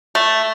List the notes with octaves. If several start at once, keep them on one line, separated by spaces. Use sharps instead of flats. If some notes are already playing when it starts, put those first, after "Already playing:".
A3